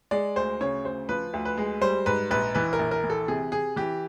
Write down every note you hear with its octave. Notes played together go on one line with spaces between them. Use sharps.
G#3 D5
D2 C5
C#3 C#5
D2 C5
F3 B4
D2
B4
G#3
G3 C5
G#2 B4
A#1 B4
E3 B4
A#4
A#1
A#4
E3
A4
C3 G#4
C3 G#4
E3 G4